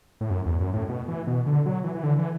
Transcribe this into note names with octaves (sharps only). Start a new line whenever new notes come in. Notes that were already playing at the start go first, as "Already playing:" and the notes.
A2
F#2
E2
F#2
A2
B2
E3
B2
D3
F#3
E3
E3
D3
E3